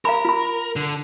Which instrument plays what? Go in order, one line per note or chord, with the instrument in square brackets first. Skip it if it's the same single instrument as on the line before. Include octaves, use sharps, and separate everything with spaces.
[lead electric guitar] A#4 [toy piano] F5 A#5 B5
[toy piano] F4 B5
[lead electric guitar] D3